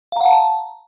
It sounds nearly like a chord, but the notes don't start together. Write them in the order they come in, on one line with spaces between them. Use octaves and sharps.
F5 A#5 F#5 A5